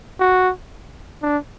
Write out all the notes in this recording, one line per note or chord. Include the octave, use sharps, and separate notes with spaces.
F#4
D4